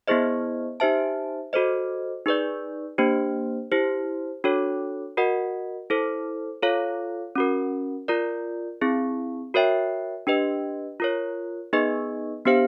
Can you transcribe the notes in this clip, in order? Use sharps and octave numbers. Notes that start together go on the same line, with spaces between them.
B3 E4 G#4 C5 D#5
D#4 G4 C5 E5 A5
F#4 A4 C5 D#5
D#4 G#4 B4 D5
A#3 D4 G4 C5
E4 G4 C5
D4 F#4 A4 C#5
F#4 A#4 D#5 F#5
E4 A4 C5
F4 A4 C#5 F5
C#4 F#4 A#4
F4 A#4 D5
C4 E4 G#4
F#4 A#4 C#5 E5 G5
D4 G4 B4 D#5
F4 A#4 C#5
B3 D#4 G#4 B4 D#5
B3 D4 G4 C5 F5